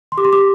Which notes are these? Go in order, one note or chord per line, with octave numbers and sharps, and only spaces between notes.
C6
G4 D6
C6
G4 D6